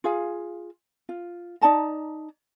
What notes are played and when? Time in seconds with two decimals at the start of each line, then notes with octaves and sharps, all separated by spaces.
0.04 F4 G#4 F5
1.09 F4
1.61 D#4 D5 A5 A#5